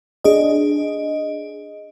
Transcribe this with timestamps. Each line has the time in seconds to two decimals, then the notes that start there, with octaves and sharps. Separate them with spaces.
0.24 D4 G#4 D#5